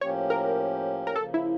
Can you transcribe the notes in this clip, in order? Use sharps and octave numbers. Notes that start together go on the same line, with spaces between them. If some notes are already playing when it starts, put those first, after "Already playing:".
A2 F3 A#3 C#4 G4 C#5
A#4
A#4
C#3 F3 A#3 A4
E4